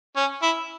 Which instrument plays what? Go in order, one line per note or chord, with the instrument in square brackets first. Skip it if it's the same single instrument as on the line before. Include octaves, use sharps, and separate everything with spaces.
[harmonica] C#4
E4